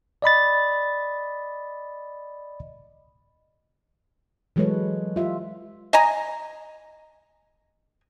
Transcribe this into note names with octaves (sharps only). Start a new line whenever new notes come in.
D5 D#5 B5 A6
E3 F#3 G#3 A4 B4 C#5
F4 G4 E5
D#5 G#5 A#5